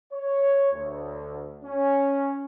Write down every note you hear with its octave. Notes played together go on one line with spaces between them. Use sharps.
C#5
D2
C#4